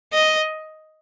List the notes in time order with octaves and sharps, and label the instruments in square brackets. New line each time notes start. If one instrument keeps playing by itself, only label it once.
[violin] D#5